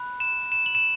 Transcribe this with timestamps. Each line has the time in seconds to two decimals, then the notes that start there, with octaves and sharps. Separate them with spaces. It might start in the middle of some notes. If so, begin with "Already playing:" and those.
Already playing: B5 F#6
0.20 E7
0.52 E7
0.66 F#7
0.75 E7